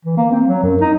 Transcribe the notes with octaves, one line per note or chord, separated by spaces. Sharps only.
E3
A#3
C4
F#3
F#2
D#4